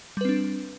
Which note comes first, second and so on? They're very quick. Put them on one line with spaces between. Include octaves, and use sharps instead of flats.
G3 B4 C4 D4